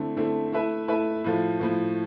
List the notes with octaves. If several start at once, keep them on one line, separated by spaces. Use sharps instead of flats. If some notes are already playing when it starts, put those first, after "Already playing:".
Already playing: D3 A3 C4 E4
D3 A3 C4 E4
A3 E4 B4 E5
A3 E4 B4 E5
A2 F3 A3
A2 F3 A3